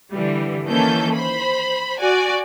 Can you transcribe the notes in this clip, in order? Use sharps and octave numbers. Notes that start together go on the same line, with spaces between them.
D3 E3 G3
D#3 E3 A#3 C#4 A4 G6
C5 B5
F#4 D5 G#5